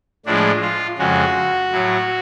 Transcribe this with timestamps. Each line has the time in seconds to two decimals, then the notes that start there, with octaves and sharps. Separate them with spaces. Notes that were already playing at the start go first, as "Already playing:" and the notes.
0.26 A2 F3 G#3 D4
0.62 F4
0.98 F2 C#3 G#3 F#4
1.71 A2 F#3